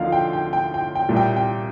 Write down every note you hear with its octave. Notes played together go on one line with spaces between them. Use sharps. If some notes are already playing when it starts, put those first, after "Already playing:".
Already playing: D2 D3 F3 A#3 D#4 F4 F5
G5
G5
G5
G5
G5
C2 A#2 G3
G5
G5